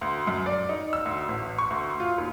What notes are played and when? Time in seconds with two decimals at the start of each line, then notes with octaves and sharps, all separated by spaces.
0.01 D2
0.27 F#2
0.46 D5
0.69 D#4
0.93 E6
1.05 D2
1.29 A1
1.58 C#6
1.70 D2
2.00 F4
2.18 D#2